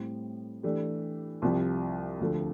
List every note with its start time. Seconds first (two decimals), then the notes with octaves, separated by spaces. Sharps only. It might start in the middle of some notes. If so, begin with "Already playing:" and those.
Already playing: A2 G3 C4
0.63 E3 A3 D4 G4
1.42 C2 C3 F3
2.20 D2 D3 F3 A3